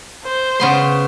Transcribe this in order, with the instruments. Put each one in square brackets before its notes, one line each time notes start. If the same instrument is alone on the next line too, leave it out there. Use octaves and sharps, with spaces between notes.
[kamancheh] C5
[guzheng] C#3 B3 C6